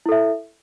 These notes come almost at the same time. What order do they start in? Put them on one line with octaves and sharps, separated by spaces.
E4 A4 E5